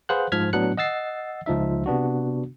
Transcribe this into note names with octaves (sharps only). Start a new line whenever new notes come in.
G#4 B4 C5 F5 F#5 F#6
G#2 F3 F6 G#6 B6
A2 F#3 B3 D4 F#6 C#7
D#5 F#5 E6 A6 C7
C#2 F3 D#4 E5
C3 B3 D4 F#4